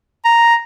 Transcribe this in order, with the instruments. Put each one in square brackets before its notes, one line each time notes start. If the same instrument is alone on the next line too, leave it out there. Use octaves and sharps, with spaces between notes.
[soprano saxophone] A#5